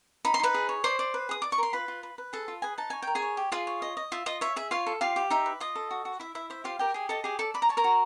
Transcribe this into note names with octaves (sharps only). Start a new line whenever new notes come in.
D#4 B5
C6
D#4 B4 B5
G#4
C#5
C5 D5 C6
D5
B4
G#4 D#6
D5 D6
C#6
A#4 C6
F4 B4 B5
F4
B4
B4
G#4 A4 A5
F4
G#4 B4 G#5
D#4 A5
C#5 G#5
A#4 G5
G#4 G#5
C#5
G4
F4 G#4 F5
C#5
D#5
D#5
F4 E5
F4 D#5
C#5 E5
G#4 E5
F4 C#5 F5
A4
F4 G4 F5
G4
D#4 E5
B4
F4 D#5
A4
F#4
F#4
E4 E5
E4 E5
C5 E5
F4 G4 F5
G4 A#4 G5
G4 G#4 G#5
A4 D#5 A5
G4 G#4 G#5
A4 D5 A5
D5 B5
A#5
C#5 A5
A#4 A#5
F#4